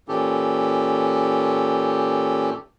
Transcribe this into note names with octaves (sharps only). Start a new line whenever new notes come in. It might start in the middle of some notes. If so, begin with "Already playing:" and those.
A#2 E3 C#4 G4 A4